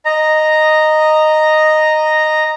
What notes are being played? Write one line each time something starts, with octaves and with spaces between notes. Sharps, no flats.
D#5 A#5